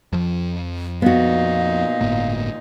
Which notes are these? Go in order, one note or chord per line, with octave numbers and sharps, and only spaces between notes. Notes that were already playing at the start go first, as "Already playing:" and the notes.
F2 F3
A#2 B3 D#4 F#4 F5
G1 A2 A#3